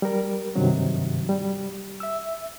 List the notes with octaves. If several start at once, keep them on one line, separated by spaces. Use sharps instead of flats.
G3 A#4
G2 C3 D#3 F#3
G3
E5 E6